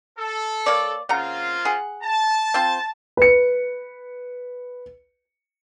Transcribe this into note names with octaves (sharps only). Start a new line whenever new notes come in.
A4
A#3 C#5 D5
C#3 A#3 C4 F4 F#5 A#5
G#4 F#5
A5
C4 F4 C5
B4 C#7